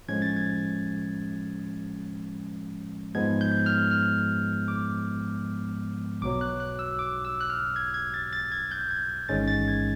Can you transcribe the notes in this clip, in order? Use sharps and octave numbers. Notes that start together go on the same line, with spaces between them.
A2 F3 G#3 C#4 G#6
A6
G#6
G#2 F3 G#3 B3 G#6
G6
F6
F6
D6
B1 B2 F#3 D6
F#6
F#6
E6
D6
E6
F#6
F6
G#6
G#6
A6
A6
G#6
G6
G#6
A1 G#2 D#3 G#3 C#4 A6
A6
G#6